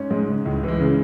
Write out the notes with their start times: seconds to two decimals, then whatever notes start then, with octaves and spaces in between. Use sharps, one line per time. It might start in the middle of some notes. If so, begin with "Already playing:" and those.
Already playing: G#2 C#4
0.11 G#2 G#3
0.28 C#3
0.45 C#2 A2
0.63 E3 G#3
0.81 C#3